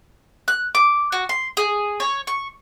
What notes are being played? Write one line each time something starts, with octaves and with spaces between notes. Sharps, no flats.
F#6
D6
F#4
C6
G#4
C#5
C#6